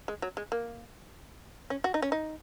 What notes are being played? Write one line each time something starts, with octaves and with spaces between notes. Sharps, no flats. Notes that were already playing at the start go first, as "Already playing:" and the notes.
G#3
F#3
G#3
A#3
C#4
F#4
D#4
C#4
D#4